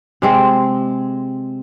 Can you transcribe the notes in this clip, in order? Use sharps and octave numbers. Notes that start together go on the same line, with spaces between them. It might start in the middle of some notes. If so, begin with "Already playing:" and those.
C3 G#3 C4